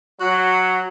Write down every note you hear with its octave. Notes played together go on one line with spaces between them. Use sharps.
F#3 F#4